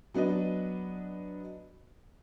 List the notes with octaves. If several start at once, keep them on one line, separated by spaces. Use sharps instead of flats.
F#3 B3 D4 B4 D#5